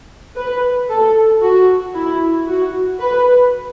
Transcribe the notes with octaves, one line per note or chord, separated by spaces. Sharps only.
B4
A4
F#4
E4
F#4
B4